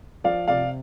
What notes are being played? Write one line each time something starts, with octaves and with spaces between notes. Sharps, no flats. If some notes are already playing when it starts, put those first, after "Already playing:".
F3 D5 F5
C3 D5 F5